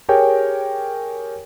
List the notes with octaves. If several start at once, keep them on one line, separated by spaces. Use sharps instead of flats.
G4 G#4 A#4 C#5 G5 G#5